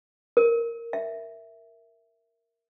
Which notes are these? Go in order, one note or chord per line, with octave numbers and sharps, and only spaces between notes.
A#4
E5